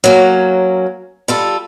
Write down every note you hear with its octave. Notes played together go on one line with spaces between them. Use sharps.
F#3 A#3 C#4
G3 F4 A4